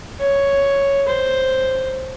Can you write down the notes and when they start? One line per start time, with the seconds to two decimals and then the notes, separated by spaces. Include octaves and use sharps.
0.21 C#5
1.08 C5